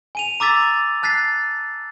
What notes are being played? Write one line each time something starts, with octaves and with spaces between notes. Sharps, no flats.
G#5 D#7 F7
A#5 D6 E6 A6 B6
A5 F#6 A6 B6 C7